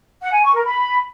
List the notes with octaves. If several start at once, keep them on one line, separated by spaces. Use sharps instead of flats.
F#5
G#5
C#6
A#4
B5